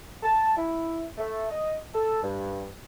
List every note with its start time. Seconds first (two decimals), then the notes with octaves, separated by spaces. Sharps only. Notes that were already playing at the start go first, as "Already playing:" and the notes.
0.23 A5
0.57 E4
1.18 A3
1.50 D#5
1.94 A4
2.23 G2